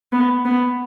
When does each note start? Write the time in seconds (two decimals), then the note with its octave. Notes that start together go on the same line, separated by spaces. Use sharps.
0.12 B3
0.45 B3